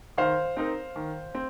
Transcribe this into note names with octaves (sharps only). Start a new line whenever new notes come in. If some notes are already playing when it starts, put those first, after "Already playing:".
D#3 C5 F5
C4 D#4 A#4
D#3
C4